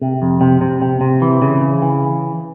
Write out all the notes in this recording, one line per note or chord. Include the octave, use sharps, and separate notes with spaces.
C3
F2
C3
C3
C3
C3
E3
C#3
C#3
E3